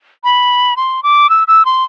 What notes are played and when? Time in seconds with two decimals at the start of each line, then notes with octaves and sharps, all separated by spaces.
0.24 B5
0.77 C6
1.03 D6
1.30 E6
1.48 E6
1.65 C6